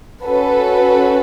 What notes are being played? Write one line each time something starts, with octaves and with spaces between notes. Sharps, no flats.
C#4 F#4 A4 B4